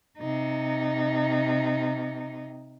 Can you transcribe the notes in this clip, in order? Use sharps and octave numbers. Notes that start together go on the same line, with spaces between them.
C3 D#4